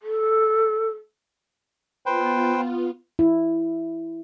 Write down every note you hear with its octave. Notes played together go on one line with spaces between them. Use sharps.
A4
B3 F4 B4 C5 G5
E4